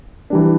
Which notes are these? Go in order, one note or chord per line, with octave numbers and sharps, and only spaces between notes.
E3 G3 D4